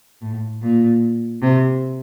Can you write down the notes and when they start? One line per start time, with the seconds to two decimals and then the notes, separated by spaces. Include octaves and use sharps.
0.22 A2
0.62 A#2
1.42 C3